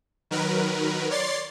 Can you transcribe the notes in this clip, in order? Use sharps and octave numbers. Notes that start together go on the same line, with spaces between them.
D#3 F#3 A#4 B4
C#5 D5 C6 A6 C7